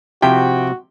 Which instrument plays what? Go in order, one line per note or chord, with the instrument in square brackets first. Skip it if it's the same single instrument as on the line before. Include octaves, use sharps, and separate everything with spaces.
[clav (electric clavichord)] C3 F3 E4 [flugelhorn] F#4 [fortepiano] G5